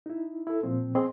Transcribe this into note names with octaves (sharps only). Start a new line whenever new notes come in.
D#4 E4
E4 A4
A#2 F3 C4
C4 G#4 D#5 C6